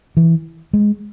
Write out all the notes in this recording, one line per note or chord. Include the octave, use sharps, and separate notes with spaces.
E3
G#3